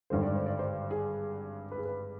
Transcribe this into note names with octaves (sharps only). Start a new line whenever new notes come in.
G#1 G2 D3 C5
D5
C5
D5
C5
G#4
B4
G#4
B4